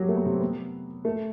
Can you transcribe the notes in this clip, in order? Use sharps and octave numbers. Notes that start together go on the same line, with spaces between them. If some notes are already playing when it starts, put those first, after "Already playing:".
Already playing: F#3 G3 F#4 G4
A3
B3
C3 C4
B3
A3